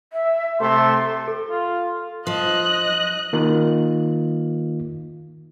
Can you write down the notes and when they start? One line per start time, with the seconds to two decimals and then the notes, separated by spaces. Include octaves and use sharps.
0.13 E5
0.60 C3 A3 A4 C6
1.28 A4
1.50 F4
2.27 F3 D#5 F#6
3.33 D#3 A#3 D#4 F4